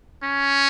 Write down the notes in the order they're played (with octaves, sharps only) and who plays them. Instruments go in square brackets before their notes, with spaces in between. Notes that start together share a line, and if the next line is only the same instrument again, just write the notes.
[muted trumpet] C#4